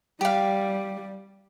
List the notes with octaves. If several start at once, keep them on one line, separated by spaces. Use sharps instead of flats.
G3 G4 F5